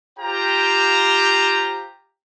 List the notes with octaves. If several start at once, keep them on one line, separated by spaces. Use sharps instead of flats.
F4 G4 C5 G5 A#5